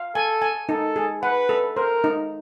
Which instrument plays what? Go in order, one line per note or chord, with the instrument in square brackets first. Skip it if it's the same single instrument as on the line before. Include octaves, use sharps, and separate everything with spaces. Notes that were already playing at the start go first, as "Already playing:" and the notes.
Already playing: [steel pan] F5
[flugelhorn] A4 [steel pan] G#5
[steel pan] G#5
[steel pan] D#4 [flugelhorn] A4
[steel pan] G#4
[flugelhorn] B4 [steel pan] F#5
[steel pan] A4
[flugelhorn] A#4 [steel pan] C5
[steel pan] D#4